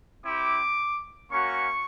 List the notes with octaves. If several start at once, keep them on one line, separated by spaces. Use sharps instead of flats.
C4 E4 G4 D6
A#3 C#4 F#4 C#6